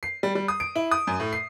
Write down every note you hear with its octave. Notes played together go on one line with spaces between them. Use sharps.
C7
G3
G3
D#6
D7
E4
D#6
F#2
A2
C7